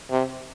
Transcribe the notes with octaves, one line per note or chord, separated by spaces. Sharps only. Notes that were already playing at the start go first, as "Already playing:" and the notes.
C3